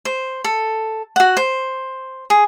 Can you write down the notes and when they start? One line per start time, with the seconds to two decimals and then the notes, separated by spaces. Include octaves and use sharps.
0.05 C5
0.44 A4
1.16 F#4 F#5
1.37 C5
2.30 G#4